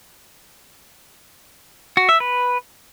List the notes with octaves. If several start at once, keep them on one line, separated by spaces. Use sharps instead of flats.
F#4
E5
B4